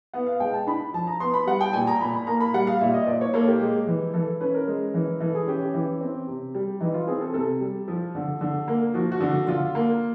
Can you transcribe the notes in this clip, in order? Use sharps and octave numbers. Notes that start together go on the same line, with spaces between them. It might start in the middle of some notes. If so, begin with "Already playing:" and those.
B3 F#5
F5
G#3 G5
A5
D4 B5
F3 A5
A#5
B3 C6
B5
G3 F#5
G5
A#2 G#5
A#5
A#2 B5
B5
A#3 A#5
B5
G3 F#5
F5
A#2 E5
D#5
A#2 D5
C#5
A#3 A4
G4
G#3
E3
E3 A4
C#4 B4
A#4
G#3
E3
E3 A4
G#4
C#4 G4
G4
E3
C4
C3
G3
E3 D#4
F4
C4 G#4
A4
C3 A4
G3
F3
D3
D3
A#3
F3 F#4
F#4
D3
F#4
D3 F4
A#3